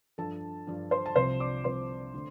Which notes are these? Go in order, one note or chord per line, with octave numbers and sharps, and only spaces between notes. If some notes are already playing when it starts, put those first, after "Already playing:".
G2 F3 D4 A4 A5
G2 F3 D4
C5 C6
A5
C2 C3 F3 C4 F4 C5 C6
D5 D6
C2 C3 F3 C4 F4 C5 C6
D3 A3